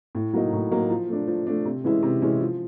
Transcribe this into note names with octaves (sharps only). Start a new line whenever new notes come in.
A2
F#3 A#3 D#4
A2
F#3 A#3 D#4
F3
A3 D4
F3
A3 D4
C3
E3 G#3 C#4 E4
C3
E3 G#3 C#4 E4
F3